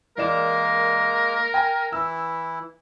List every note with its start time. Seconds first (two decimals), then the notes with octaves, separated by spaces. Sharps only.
0.18 E3 G#3 A#3 A#4 D5 F5 E7
1.54 G5 G#5
1.92 E3 E4 E6